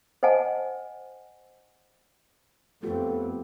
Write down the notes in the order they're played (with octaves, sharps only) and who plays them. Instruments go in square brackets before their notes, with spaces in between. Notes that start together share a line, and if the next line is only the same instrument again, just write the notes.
[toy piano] C5 D#5 F#5 G#5 A5
[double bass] F2 C4 [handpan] A3 F4 G4 [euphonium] B3 [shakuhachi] A4